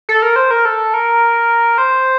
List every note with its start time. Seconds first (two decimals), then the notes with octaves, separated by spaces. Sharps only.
0.09 A4
0.22 A#4
0.36 C5
0.51 A#4
0.65 A4
0.94 A#4
1.78 C5